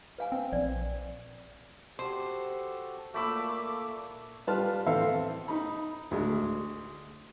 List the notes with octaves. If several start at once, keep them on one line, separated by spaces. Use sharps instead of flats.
B4 F5 G#5
C4
A#1 D5
F#4 G4 A4 C5
A#2 A3 A#3 B5 D6 E6
G3 F4 B4 A5 F6
E3 C4 A4 E5 F5
D#4 B5
D2 G#3